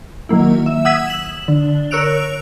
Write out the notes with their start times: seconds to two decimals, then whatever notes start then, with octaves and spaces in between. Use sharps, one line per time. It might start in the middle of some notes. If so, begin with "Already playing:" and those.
0.29 D#3 F#3 A#3 E4
0.66 E5
0.85 F#5 D#6 E6 G#6 B6
1.07 E7 F#7
1.48 D3
1.91 A#4 C#5 E6 F#6 D7 F7